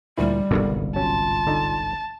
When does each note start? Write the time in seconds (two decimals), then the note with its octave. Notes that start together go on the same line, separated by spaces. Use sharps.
0.18 D2 A#2 G3 E4
0.51 G1 C2 G#2 B2 D3 D#3
0.96 F#3 C#4 F4 A5
1.47 D3 D#4